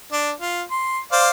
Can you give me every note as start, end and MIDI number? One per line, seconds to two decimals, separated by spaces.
0.12 0.32 62
0.41 0.62 65
0.71 0.99 84
1.12 1.30 72
1.12 1.30 74
1.12 1.30 77